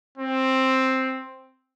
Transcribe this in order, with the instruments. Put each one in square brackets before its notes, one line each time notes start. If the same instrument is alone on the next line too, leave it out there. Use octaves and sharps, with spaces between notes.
[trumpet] C4